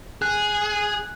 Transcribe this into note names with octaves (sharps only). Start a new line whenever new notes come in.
G#4 F#6